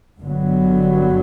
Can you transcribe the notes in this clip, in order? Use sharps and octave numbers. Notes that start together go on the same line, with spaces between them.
G1 G2 D3 F#3 B3